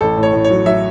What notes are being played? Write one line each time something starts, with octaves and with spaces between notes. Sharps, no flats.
A1 A4
A2
C#5
A2
C#5
F#3
F#3 E5